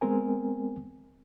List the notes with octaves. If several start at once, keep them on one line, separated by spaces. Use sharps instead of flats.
G#3 B3 C4 A#4 G#5